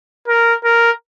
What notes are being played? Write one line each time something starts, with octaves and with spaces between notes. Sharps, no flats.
A#4
A#4